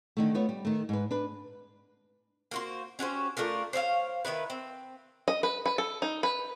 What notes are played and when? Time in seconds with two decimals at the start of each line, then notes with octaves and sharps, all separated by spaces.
0.17 D3 D#3 A3
0.35 A3 B3 F4 C#5
0.49 G3
0.65 D#3 A3
0.89 G#2 B4
1.11 D4 B4
2.51 A#3 F#4 C5
2.99 C#4 F#4 G4 C5
3.37 A3 D4 F4 A#4
3.73 C5 C#5 E5 F5
4.25 D#3 B3 E4 B4
4.50 C4
5.28 D#5
5.43 B4
5.66 B4
5.78 A4
6.02 D#4
6.23 B4